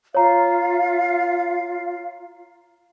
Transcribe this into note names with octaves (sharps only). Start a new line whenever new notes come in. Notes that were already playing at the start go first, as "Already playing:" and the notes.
F4 C#5 F5 A#5